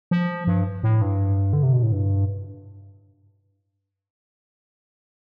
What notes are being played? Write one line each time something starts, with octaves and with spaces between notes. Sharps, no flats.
F3
G2
A2
G2
D3
C3
B2
A2
G2